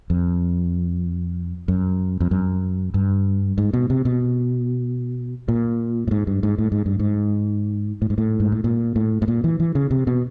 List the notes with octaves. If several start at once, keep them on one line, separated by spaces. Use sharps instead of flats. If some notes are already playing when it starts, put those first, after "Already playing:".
F2
F#2
F2
F#2
G2
G#2
B2
C3
B2
A#2
A2
G#2
G2
G#2
A2
G#2
G2
G#2
A2
G#2
A2
G#2
A2
A#2
A2
A2
A#2
E3
E3
C#3
C3
B2